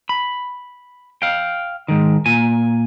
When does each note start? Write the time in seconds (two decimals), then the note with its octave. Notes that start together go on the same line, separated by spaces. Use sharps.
0.09 B5
1.22 F5 G5
1.88 G#2 D#3
2.26 A#2 G#5